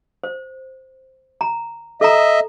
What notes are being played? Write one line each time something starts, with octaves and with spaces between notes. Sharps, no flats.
C5
A#5
A4 D#5 E5 A#5